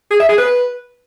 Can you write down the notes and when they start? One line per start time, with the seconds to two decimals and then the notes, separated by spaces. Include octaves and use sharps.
0.11 G#4
0.20 E5
0.29 G#4
0.38 B4